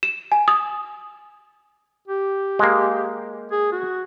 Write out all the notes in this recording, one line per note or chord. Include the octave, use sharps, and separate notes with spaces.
E7
G#5
D#6
G4
G#3 A#3
G#4
F#4